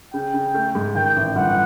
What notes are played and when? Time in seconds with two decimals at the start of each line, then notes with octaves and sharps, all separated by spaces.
0.14 C#3 G5
0.34 C#3
0.54 A3
0.75 G#2
0.95 D#3 G5
1.16 A1
1.36 G1 F#5